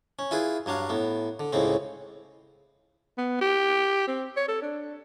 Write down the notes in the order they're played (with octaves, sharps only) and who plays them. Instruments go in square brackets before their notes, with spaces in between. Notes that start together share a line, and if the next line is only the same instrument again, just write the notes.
[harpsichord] C#4
E4 F4 G#4 B4
G2 F#3 D4 F5
A2 B3
D3
C#2 A2 C#3 C4
[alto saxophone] B3
G4
C4
C#5
A4
D4